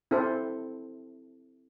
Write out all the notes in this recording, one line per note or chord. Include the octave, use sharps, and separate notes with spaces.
C4 E4 A4 C5